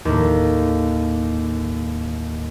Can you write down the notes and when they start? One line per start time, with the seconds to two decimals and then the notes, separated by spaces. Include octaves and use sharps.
0.05 D#2 A2